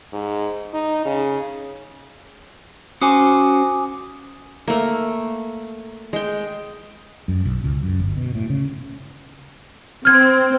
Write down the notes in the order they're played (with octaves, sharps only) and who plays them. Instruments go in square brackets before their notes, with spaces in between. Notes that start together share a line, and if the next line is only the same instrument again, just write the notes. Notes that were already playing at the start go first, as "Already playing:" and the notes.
[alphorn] G#2
D#4
C#3
[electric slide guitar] C#4 F#4 C5 [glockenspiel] G#5 D6 D#6
[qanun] A3 A#3
G#3 G5
[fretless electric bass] F#2
B1
C#2
F#2
G1
B2
A2
C#3
[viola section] C4 [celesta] F6 G#6